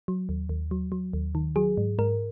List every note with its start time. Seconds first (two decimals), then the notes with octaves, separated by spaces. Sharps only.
0.08 F#3
0.29 D#2
0.49 D#2
0.71 F#3
0.92 F#3
1.13 D#2
1.35 D#3
1.56 F#3 G#4
1.77 G#2
1.99 G#2 A#4